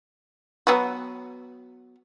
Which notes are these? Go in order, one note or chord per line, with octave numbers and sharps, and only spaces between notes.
F#3 B3 F#4